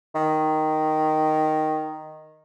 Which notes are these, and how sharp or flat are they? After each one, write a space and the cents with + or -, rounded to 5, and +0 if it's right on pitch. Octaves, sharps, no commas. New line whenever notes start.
D#3 +0